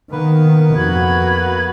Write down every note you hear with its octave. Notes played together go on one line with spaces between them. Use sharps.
D#3 A#3 B3 B4
F2 F#4 B5 G#6